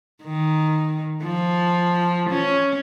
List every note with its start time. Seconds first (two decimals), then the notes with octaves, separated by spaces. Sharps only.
0.23 D#3
1.23 F3
2.29 C#4